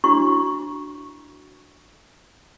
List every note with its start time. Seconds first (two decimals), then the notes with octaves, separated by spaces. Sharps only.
0.04 D4 E4 F#4 C#6